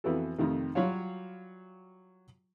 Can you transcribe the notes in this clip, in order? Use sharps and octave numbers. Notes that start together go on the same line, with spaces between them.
F2 E3 B3 F#4 A4
F2 C3 D#3 A3
F#3 G3 F4 F#4 C#5 F5